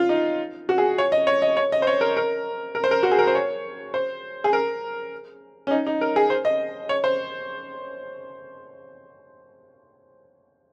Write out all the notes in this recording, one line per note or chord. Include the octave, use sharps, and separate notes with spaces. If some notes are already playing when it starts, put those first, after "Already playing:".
Already playing: F4
D#4
F#4
G#4
C#5
D#5
C#5
D#5
C#5
D#5
C5
C#5
A#4
A#4
A#4
C5
A#4
F#4
G#4
A#4
C5
C#5
C5
G#4
A#4
C#4
D#4
D#4
A#4
G#4
C5
D#5
C#5
C5